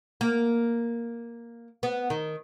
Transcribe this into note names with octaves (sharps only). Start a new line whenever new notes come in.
A#3
B3
D#3